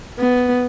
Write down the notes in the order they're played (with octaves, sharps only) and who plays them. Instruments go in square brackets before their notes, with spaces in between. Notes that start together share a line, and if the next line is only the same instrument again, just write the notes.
[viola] B3